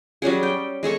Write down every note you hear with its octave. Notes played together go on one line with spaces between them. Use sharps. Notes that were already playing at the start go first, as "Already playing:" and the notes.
F#3 G3 C#4 G#4
G5
G#3 G#4 A4 C#6